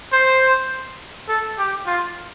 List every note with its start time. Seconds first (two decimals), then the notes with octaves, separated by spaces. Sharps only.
0.12 C5
1.28 A4
1.58 G4
1.87 F4